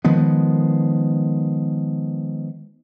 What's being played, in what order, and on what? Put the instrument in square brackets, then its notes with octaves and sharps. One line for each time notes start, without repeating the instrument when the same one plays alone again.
[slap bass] D#3 F3 G#3 B3